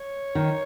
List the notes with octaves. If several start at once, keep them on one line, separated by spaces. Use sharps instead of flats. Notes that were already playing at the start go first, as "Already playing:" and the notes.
Already playing: C#5
D#3